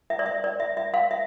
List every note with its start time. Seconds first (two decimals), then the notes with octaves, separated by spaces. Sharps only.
0.10 E5
0.19 D5
0.26 E5
0.44 D5
0.60 E5
0.77 E5
0.94 F5
1.11 E5